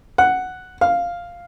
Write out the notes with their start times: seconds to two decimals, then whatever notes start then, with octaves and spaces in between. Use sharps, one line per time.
0.18 F#5
0.81 F5